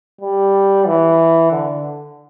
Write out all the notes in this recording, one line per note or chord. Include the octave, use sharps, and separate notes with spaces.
G3
E3
D3